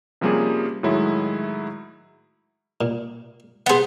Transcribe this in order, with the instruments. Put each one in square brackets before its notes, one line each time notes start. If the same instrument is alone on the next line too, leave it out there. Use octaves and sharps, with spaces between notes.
[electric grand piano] C3 F3 G3 A#3 C#4 G#4
A2 D#3 F#3 G#3 E4
[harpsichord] A#2
[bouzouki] B3 C5 [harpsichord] G#4 F#5